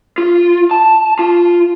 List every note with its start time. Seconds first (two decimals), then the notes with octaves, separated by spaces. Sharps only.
0.18 F4
0.71 A5
1.19 F4